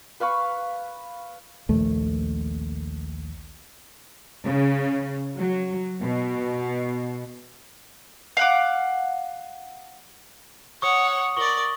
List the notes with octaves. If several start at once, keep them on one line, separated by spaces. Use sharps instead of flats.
B4 F5 B5 C#6
A#1 D#2 A3
C#3
F#3
B2
F5 F#5 D6
C#5 F#5 C#6 D#6
A#4 D5 C#6 F#7 G7